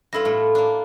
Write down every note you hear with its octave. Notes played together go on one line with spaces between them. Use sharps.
G2 E4 F4 A4 A#6
A2 A3
A#3 D4